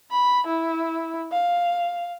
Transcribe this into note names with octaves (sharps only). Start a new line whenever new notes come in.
B5
E4
F5